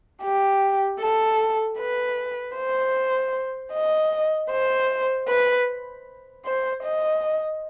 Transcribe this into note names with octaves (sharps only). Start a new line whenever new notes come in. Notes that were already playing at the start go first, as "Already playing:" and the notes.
G4
A4
B4
C5
D#5
C5
B4
C5
D#5